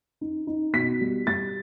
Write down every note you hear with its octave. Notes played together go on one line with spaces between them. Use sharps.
D#4
D#4
B2 B6
G3
G3 A6